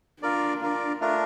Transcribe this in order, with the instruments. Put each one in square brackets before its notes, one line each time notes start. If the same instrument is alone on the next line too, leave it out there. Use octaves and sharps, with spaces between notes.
[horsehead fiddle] D4 [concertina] F4 A#4 D5
[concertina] F4 A#4 D5
A3 D4 F4 A#4